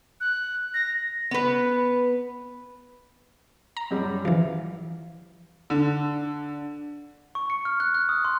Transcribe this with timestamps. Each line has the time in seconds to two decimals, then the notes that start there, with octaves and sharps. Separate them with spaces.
0.21 F#6
0.74 A#6
1.31 B3 B4
3.77 A#5
3.91 F#2 G3
4.25 E3 F3 F5
5.70 D3
7.35 C#6
7.50 C#7
7.65 F6
7.80 F#6
7.94 F#6
8.09 D#6
8.25 C6